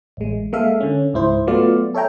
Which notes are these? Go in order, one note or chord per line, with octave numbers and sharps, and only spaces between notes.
A1 G#3
G#3 A#3 A4 E5 F5
D3 C#4
C#2 G#2 E4 C5
F#3 A3 B3 F4 D5 F5
A4 C#5 E5 G5 A#5